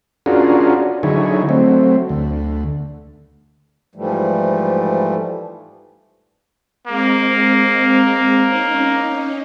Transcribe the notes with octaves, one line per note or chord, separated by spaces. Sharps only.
C#4 D4 F4 F#4 G#4 A#4
D3 F#3 D#4 E4 G#4 C#5
F#3 A3 C4
D2
G#2 E3 F3 G3 A3
G#3 A#3 C4
C#4 D#4